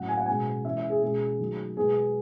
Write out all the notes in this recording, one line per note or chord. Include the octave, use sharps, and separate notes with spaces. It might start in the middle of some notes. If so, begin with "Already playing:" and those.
Already playing: A2 F#3 C#4 F#5
G#5
F#5
B2 G#3 C#4 G#5
E3 G#3 C#4 E5
E5
G#4
B2 G#3 C#4 G#4
D#3 F#3 A3
B2 G#3 B3 G#4